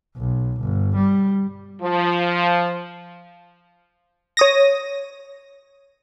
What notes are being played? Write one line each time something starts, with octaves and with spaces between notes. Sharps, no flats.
B1
G1
G3
F3
C#5 D#6 A#6